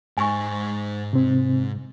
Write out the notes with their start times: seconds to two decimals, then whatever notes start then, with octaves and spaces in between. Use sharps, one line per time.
0.17 G#2 D#4 G#5 C#6
1.13 C3 C4